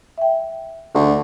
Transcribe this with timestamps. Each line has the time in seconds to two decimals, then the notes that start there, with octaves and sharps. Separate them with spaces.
0.18 E5 G5
0.95 D2 D3